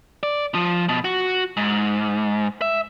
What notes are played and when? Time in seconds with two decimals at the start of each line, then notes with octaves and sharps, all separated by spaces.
0.23 D5
0.55 F3
0.89 B2
1.05 F#4
1.57 G#2
2.62 E5